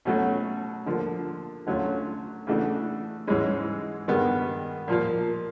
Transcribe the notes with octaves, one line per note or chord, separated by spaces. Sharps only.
B2 F#3 A3 C#4 F#4
D3 F3 A#3
D3 F#3 A3 C#4 F4
C#3 E3 A3 D4 F#4
G#2 E3 G#3 C#4
G2 D#3 G#3 B3
A#2 F3 A#3